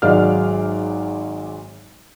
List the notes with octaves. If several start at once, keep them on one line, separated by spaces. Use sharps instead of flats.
G#1 F#3 G#3 D5 F5 F6